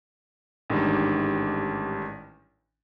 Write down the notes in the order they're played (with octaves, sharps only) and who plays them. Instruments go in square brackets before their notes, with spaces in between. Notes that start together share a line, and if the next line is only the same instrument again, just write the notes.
[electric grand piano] A1 G#2 D#3 G3 D4